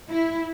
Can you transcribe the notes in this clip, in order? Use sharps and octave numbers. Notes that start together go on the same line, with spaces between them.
E4